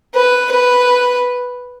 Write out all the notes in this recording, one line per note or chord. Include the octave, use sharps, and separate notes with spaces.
B4
B4